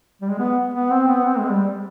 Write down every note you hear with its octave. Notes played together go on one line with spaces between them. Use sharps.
G3
G#3
B3
B3
C4
B3
C4
G#3
G3